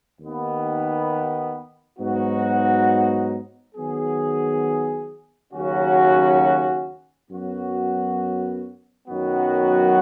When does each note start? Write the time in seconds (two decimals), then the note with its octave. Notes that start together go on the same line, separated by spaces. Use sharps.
0.20 D#2 D#3 B3
1.97 G#2 F#3 B3 D#4 F#4
3.75 D#3 F#3 B3 G#4
5.52 D#2 C#3 F#3 C#4 F#4
7.30 F#2 F#3 B3 F#4
9.07 F#2 D#3 F#3 B3 F#4